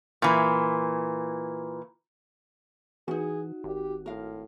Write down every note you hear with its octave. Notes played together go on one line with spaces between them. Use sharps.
A#2 E3
E3 C#4 D#4 F#4 G#4
G#1 G4
A2 A#4 F5